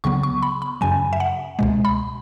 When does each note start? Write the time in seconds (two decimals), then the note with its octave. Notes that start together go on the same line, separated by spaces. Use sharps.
0.04 C#2 C#3 F#3 B3 C#6
0.23 C#6
0.43 B5
0.62 B5
0.81 F#2 C#3 F#3 G#5
1.13 E5
1.20 F#5
1.59 C#2 B2 G#3
1.85 B5